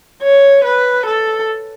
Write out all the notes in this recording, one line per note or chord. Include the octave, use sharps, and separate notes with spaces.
C#5
B4
A4